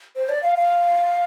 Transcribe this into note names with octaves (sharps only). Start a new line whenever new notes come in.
C5
D5
F5
F5